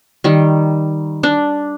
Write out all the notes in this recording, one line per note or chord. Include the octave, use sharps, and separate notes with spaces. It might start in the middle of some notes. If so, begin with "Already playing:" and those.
D#3 G3
D4